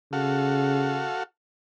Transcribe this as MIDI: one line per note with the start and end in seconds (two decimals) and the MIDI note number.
0.13 1.12 49
0.13 1.23 66
0.13 1.23 69
0.13 1.23 77